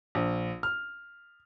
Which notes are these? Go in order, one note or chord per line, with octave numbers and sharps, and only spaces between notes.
A#1
F6